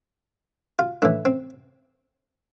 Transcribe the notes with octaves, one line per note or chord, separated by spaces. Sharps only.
F4
A2 E3 D4
C4